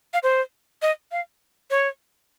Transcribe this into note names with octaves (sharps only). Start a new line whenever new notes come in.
F5
C5
D#5
F5
C#5